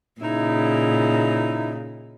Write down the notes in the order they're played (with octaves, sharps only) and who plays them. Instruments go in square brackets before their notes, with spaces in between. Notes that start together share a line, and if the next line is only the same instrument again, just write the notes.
[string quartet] A#2 C#3 [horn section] D#4 E4